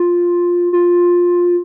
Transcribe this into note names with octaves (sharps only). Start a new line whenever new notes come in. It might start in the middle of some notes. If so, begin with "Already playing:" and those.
Already playing: F4
F4